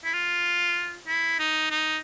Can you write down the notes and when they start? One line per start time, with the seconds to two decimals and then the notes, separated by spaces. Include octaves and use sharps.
0.04 E4
0.14 F4
1.08 E4
1.39 D#4
1.71 D#4